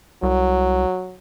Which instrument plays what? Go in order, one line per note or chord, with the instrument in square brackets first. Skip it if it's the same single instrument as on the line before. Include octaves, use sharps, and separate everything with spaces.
[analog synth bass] C2 [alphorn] F#3